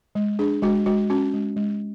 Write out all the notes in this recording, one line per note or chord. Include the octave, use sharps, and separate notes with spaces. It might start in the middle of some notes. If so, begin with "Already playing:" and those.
G#3
D4 G#4
G#3 F#4
G#3 F#4
C#4 F#4
G#3
G#3